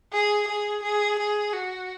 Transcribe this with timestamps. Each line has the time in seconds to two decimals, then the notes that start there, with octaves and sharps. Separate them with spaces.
0.13 G#4
0.48 G#4
0.83 G#4
1.18 G#4
1.53 F#4